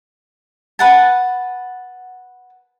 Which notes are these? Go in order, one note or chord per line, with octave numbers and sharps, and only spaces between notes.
B4 F#5 A5